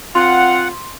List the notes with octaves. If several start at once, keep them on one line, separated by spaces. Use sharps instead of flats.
C4 F4 F#5 C6